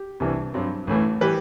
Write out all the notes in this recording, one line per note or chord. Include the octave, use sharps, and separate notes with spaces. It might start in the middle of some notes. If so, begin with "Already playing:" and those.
Already playing: G4
C2 C3 E3 G3 D4
G2 F#3 C4
A1 A2 E3 A3
E3 G3 G4 B4